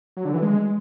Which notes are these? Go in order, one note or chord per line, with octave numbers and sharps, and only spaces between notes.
F#3
D3
E3
G#3